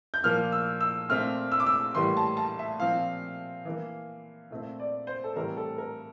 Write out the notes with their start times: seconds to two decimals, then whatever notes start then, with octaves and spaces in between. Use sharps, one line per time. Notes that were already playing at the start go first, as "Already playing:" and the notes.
0.14 G6
0.24 A#2 F3 A#3 F6
0.52 E6
0.81 E6
1.09 A#2 A3 C4 F6
1.52 E6
1.60 D6
1.67 E6
1.95 A2 E3 G3 A#3 C6
2.17 A5
2.37 A5
2.59 E5
2.80 A#2 F3 C4 F5
3.65 E3 A#3
4.51 A#2 A3 C4
4.80 D5
5.07 C5
5.24 A4
5.36 A2 E3 G3 C4 A#4
5.57 A4
5.78 A#4